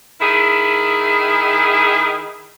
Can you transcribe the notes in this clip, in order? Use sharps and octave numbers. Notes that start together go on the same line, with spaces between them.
D#3 E4 G#4